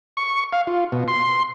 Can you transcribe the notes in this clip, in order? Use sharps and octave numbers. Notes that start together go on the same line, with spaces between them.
C#6
F5
F4
B2
C6